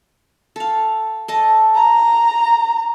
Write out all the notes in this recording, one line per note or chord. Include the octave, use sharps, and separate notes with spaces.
A4 F5
A4 D#5 A5
A#5